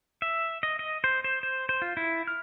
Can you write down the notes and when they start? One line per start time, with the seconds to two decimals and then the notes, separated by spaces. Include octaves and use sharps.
0.22 E5
0.63 D#5
0.79 D#5
1.04 C5
1.24 C5
1.43 C5
1.69 C5
1.82 F4
1.97 E4
2.27 F6